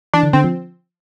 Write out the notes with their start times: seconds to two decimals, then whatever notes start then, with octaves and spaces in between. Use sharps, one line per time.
0.13 E3 D4
0.23 D3
0.33 D3 C4
0.44 F3